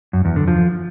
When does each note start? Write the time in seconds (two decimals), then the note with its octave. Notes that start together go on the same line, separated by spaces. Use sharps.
0.13 F#2
0.25 E2
0.36 D3
0.48 F3